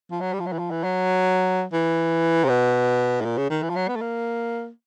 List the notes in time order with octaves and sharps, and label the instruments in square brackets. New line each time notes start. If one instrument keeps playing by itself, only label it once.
[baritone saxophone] F3
F#3
G3
F3
F#3
E3
F3
E3
F#3
E3
C3
B2
A2
A#2
C#3
D#3
E3
F3
F#3
B3
A3
A#3